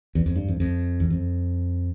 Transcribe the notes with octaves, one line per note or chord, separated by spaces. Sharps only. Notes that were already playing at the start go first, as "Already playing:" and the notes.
E2
F2
G2
F2
F2
E2
F2